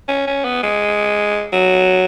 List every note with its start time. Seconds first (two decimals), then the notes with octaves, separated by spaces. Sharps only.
0.08 C#4
0.27 C#4
0.45 B3
0.63 G#3
1.53 F#3